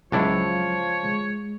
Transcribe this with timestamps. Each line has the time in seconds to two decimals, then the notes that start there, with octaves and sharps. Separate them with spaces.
0.12 C#2 F3 F#3 D4 E4 C#5
1.03 G#3